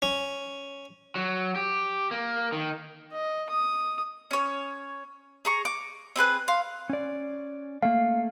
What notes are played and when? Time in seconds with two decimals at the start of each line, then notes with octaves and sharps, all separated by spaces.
0.02 C#4
1.16 F#3
1.56 G4
2.11 A#3
2.52 D#3
3.12 D#5
3.49 D#6
4.31 C#4 C#5
5.45 G#4 A#5 C#6
5.65 D6
6.16 C4 G#4 B4 F#6
6.48 F5 C6
6.90 C#4 D5
7.82 A3 A#3 F5